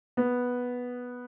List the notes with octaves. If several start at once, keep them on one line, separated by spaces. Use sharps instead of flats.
B3